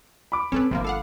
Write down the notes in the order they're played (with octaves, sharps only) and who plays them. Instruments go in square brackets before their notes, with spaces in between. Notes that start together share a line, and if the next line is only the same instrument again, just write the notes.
[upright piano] B5 D6
[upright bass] C4 [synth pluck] C#4 A4 B4
[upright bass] G1 [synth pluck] C3 F3 A#3
[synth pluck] A4 F5 F#5